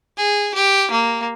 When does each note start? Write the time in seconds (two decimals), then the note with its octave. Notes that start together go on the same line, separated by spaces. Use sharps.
0.18 G#4
0.55 G4
0.91 A#3